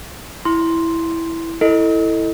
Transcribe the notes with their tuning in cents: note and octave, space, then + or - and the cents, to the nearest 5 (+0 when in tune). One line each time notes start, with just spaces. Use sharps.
E4 +0 C6 +0
E4 +0 A4 +15 D#5 +0